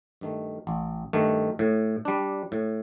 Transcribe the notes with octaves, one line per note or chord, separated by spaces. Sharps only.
G2 D#3 A3
A1
G2 D#3 A3
A2
G3 D4
A2